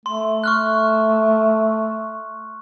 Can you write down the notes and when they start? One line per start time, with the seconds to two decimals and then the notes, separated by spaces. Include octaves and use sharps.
0.06 A3 C6
0.44 A3 C#6 F6 F#6